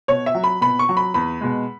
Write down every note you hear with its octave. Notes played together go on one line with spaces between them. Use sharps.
B2 C#5
E5
F#3
B5
B2 B5
C#6
F#3
B5
E2 B5
B2 G#3